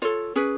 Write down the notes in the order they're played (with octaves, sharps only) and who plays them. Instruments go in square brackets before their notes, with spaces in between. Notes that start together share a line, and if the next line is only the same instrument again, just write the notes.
[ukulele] F4 A4 C#5
C#4 G#4 B4